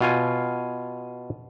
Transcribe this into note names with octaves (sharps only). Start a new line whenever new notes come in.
B2 F4 G#5